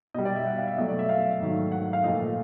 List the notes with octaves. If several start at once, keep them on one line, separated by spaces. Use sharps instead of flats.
B2 G3 D#5
D5
E5
F#5
F5
E5
B2 F#3 A3 D#5
D5
E5
F5
G#2 D#3 F#3 A3
F#5
F#5
F5
A#2 F3 A3 D#5